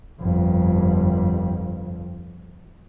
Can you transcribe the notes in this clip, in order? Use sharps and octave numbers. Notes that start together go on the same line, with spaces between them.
G1 F2